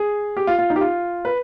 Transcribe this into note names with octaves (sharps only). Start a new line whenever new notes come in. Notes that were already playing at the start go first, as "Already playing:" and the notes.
Already playing: G#4
G4
F4
F4
D#4
G4
F4
B4